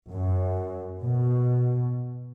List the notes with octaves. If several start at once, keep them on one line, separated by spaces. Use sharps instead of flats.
F#2
B2